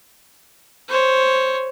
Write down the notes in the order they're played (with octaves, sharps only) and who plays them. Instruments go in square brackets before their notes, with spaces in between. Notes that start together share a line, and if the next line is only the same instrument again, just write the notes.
[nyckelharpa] C5 C#5